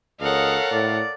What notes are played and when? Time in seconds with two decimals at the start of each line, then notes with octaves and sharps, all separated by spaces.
0.20 C#2 A4 A#4 C#5 D#5 F5 F#5
0.72 A2 D5